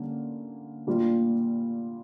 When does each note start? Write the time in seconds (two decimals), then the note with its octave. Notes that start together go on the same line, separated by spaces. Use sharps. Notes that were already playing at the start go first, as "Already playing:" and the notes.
Already playing: D3 G3 A#3 C#4
0.87 A#2 G3 A#3 D4 F4